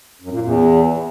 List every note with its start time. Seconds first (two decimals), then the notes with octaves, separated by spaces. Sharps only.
0.22 F#2
0.32 A#2
0.42 E2